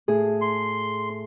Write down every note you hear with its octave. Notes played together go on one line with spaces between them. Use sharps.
A2 G#4
C6